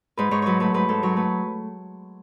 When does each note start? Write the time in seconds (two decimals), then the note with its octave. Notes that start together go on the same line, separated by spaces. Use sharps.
0.17 G#2 B4
0.31 G#2 C#5
0.42 F#3 B4 C#5
0.60 A3 B4
0.74 G#2 B4
0.89 G#2 A4
1.03 F#3 C#5
1.16 A3 B4